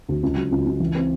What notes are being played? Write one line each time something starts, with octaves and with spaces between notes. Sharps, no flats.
D2
C#2
F#3
C#2
C#2
E3
C4